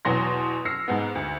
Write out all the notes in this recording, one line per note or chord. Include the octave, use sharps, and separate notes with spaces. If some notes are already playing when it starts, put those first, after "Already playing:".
E2 B2 F#3 C6 A#6
E6 F6 A#6 C7 C#7
G#2 G#3 B3
D2